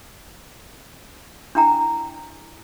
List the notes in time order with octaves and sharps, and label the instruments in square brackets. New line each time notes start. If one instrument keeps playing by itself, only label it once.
[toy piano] D4 E4 G5 A#5